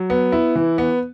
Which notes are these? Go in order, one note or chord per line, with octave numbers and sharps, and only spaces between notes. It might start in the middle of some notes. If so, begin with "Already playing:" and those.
Already playing: F#3
B3
E4
E3
B3